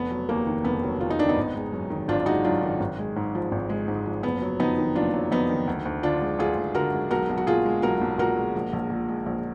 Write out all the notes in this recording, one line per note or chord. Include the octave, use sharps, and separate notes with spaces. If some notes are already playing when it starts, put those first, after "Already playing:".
Already playing: F1 B3
F#3
D#2 A#3
D#3
F1 B3
F#3
D#2 F4
D#4
D#3 D4
B3 D#4
G#1
G#3
F#2
D#3
G#1 D4 F4
G#3 D#4 F#4
F#2 D4 F4
D#3
G#1
G#3
G#2
F3
G#1
G#3
G#2
F3
F#1 B3
F#3
F2 B3 D#4
D#3
F#1 D4 F4
F#3
F2 B3 D#4
D#3
D2
D2
D3 D4 F4
G#3
D2 F4 G#4
D2
D3 F#4 A#4
G#3
B1 F#4 A#4
B1
F#4
A#2 F4 G#4
G#3
B1 F#4 A#4
B1
A#2 F#4 A#4
G#3
A#1
A#1
A#2
G#3
A#1